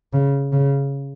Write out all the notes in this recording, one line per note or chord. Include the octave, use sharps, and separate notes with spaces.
C#3
C#3